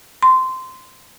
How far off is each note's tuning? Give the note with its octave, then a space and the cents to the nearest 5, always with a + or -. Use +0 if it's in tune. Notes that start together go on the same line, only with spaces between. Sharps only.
C6 -15